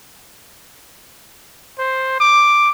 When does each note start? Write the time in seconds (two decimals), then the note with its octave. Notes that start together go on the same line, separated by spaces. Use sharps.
1.79 C5
2.20 D6